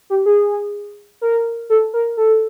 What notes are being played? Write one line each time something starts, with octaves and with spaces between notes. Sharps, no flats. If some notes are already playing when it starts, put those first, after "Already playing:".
G4
G#4
A#4
A4
A#4
A4